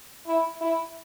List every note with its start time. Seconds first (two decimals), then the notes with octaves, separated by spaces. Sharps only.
0.27 E4
0.61 E4